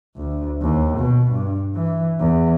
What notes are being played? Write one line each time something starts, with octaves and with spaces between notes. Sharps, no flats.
D2
D#2
B2
G2
E3
E2